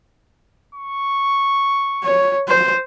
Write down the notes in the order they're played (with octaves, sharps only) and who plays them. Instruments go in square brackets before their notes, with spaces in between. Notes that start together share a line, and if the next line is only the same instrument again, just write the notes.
[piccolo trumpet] C#6
[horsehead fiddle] C#5
C5